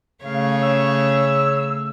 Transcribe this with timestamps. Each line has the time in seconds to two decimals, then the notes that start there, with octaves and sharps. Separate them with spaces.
0.24 C#3 A3 C#5 F5
0.62 E6